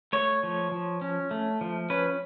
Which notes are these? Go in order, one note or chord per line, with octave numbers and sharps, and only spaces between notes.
A3 C#5
F3
F3
C#4
A3
F3
C#4 B4